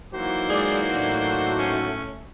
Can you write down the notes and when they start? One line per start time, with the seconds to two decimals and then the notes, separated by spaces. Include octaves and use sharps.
0.14 E3 F#3 A#3 D#4 F#4 C5
0.50 G#3 E4 G#4 D5
0.94 A2 A3 D4
1.59 C#4